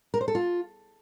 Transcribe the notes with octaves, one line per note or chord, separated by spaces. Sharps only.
A#4
C5
A4
F4